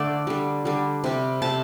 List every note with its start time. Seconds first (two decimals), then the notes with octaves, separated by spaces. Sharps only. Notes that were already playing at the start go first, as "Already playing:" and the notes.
Already playing: D3 A3 D5
0.27 D3 G3
0.65 D3 G3
1.04 C3 G3
1.42 C3 A3 A5